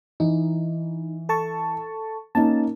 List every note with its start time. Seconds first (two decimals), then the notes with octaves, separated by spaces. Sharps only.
0.20 E3 D#4
1.29 A4 A5 C#6
2.35 A#3 C#4 D#4 A5